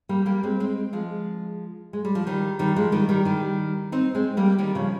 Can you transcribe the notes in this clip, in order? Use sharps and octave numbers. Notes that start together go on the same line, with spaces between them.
G3 A#3
G3 A#3
G#3 C4
G#3 C4
F3 G#3
G#3
G3
F3
D#3 G3
D#3 G3
F3 G#3
D#3 G3
D#3 G3
D#3 G3
C4 D#4
G#3 C4
G3 A#3
D#3 G3
C#3 F3